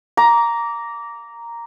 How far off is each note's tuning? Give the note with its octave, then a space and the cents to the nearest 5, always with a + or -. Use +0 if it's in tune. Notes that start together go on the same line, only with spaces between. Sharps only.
A#5 +0 D6 -20